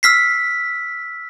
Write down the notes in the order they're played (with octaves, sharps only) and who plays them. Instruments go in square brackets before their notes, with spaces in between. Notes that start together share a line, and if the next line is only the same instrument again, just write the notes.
[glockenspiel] E6 F6 B6 C7